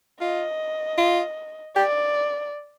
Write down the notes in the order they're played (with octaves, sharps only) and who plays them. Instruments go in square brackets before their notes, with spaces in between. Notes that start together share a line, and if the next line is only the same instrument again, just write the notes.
[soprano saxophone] F4 [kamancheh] D#5
[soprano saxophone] F4
[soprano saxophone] G4 [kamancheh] D5